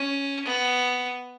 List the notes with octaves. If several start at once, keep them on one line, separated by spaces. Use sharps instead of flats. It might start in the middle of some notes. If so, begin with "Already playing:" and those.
Already playing: C#4
B3